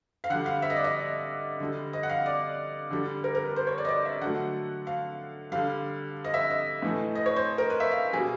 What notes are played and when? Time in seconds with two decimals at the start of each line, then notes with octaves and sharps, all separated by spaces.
0.24 F5
0.30 D3 G3 F#5
0.46 F5
0.62 E5
0.70 D#5
0.77 D5
0.84 D#5
1.60 D3 G3
1.93 D#5
2.03 F#5
2.09 F5
2.26 D5
2.91 D3 G3
3.24 A#4
3.35 A#4
3.45 B4
3.56 C5
3.67 C#5
3.78 D5
3.85 D#5
3.88 D5
4.05 E5
4.21 D3 F#3 A3 F#5
4.87 F5
5.52 D3 G3 F5
6.24 D#5
6.34 E5
6.50 D#5
6.82 A2 E3 A3
7.15 D#5
7.26 C#5
7.36 C5
7.58 A#4
7.70 B4
7.80 E5
7.91 F5
8.13 B2 G3 G#4